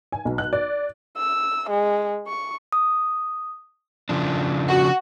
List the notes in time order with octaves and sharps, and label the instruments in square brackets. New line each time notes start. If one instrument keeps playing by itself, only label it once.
[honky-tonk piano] G#5
B1
F#6
D5
[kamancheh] E6
G#3
C#6
[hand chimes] D#6
[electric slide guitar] C#3 F3 D4
[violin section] F#4